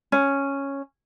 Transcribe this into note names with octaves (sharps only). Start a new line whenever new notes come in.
C#4